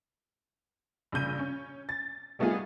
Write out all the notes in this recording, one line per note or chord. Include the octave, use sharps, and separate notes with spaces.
A#1 G2 C#3 G6 D#7
C#4
A6
G3 A3 B3 D#4 F4 G#4